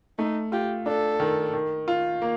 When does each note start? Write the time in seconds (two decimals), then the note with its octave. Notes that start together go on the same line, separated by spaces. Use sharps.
0.19 A3 D#4
0.52 F4 G4
0.86 D4 A4
1.20 D#3
1.54 D#3
1.88 F4
2.22 A#3